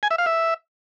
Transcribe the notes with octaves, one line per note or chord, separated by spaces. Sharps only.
G#5
E5
F5
E5